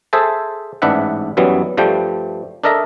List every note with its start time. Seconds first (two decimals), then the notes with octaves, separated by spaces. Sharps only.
0.13 G#4 A4 C5 E5 A5
0.82 A1 G#2 D4 B4 E5 F#5
1.37 F#2 E3 F#3 G3 B3
1.77 G2 F3 G3 A3 G5
2.64 D4 A4 A#4 D#5 E5 A#5